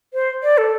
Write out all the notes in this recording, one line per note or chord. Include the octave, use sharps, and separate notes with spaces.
C5
D5
A4